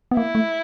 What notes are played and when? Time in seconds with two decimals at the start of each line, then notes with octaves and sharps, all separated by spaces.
0.11 B3
0.16 A#3 E4
0.35 A3